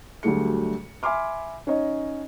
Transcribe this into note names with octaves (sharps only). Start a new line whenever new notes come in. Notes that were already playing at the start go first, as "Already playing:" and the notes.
D2 F#3 G3 A3 G#4 C#7
E5 G#5 B5 C6 D6 F6
C#4 D#4 C#5 D#5